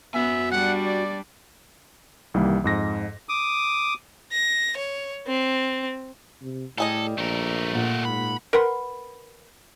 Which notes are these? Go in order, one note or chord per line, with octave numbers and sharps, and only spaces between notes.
B3 F#4 E5 G#5
G3 D4 F#5
D5
C2 D#3 E3 G3 A#3
F2 G#2 A#6
D6 D#6
A#6
C#5
C4
C3
A2 G3 G#4 A4 D#5
A#1 A3 A#4
A#2 F#5
G#2 B5
A#4 B4 F#5 C6